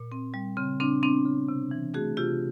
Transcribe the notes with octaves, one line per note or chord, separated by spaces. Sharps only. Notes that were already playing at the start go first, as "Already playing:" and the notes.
Already playing: A#2
C4
G3
C#3 C4
C#3 C4 D4
B3 C4 D4
C#3
C3
E3
A3 F#4 G#4
C3 F4 G4